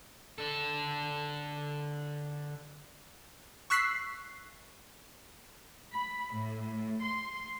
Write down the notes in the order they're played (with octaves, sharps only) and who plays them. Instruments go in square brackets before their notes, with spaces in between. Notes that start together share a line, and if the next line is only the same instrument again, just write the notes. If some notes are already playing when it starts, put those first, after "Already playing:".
[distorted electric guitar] D3 A4
[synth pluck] C#6 E6 F#6 B6 C7
[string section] B5
A2
C6